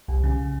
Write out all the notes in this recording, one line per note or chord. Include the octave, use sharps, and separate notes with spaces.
C2
C#3